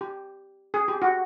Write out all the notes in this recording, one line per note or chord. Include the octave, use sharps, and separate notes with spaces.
G4
G#4
G4
F#4